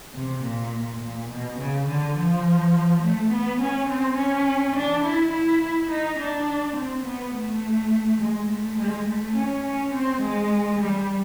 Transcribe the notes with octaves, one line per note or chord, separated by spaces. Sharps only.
C3
A#2
A#2
B2
C#3
D3
F3
A3
B3
C#4
C4
C#4
D4
E4
E4
E4
D#4
D4
C4
B3
A3
G#3
A3
G#3
A3
C#4
C#4
C4
G#3
G3